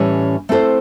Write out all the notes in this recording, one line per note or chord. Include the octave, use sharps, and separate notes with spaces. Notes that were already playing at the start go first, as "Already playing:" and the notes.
Already playing: A2 E3 G3 C#4
A3 C4 E4 A4 C5